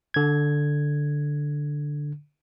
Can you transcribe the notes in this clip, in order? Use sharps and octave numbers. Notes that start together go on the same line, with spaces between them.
D3 G#6